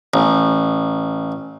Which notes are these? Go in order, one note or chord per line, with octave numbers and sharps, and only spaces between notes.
A1